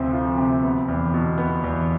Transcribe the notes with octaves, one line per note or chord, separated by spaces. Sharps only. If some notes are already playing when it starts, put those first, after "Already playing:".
Already playing: D2 C3 F3 C4
F3
C3
B3
E2
B2
B3
E2